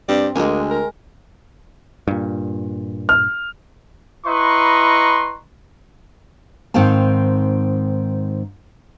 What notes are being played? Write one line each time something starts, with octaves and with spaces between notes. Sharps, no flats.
G2 C4 D5
D2 G#3 A#3 G#5
A#4
G2 A#2
F6
E4 B4 D#5 A#5 C6 C#6
G#2 D#3 C4 D#4 F5 A5